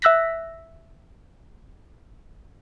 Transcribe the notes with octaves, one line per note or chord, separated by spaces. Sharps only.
E5 E6 F#6 A#6 B6